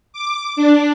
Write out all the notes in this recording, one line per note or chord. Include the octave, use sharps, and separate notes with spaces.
D6
D4